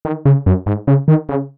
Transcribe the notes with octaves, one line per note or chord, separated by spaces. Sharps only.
D#3
C#3
F#2
G#2
C#3
D#3
C#3